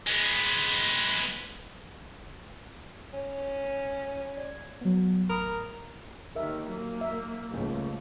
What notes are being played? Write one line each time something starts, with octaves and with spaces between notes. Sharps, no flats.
G#3 B3
C#4
D5 G#6
F#3 B3
A1 A#4 B5 D#6
D#2 D#3 A#4 E5
F#3 A#3
E5
C#2 G#2 G3 A3 A#3